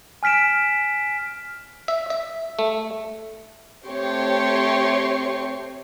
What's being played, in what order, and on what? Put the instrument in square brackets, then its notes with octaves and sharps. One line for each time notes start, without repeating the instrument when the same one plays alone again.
[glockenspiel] G#5 F6 B6 D7 E7
[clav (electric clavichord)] E5
E5
A3
[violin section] A3 C4 G4 C#5 C6 C#6